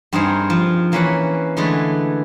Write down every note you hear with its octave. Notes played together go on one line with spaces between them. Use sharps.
G2 C4 D#4 G#4 A#4 C5
F3
E3 A#3 C#4 B4 C#5 B5
D3 E3 G#3 A3 G#4 B4